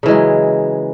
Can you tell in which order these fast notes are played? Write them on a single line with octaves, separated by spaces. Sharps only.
C#3 E3 G#3 F#3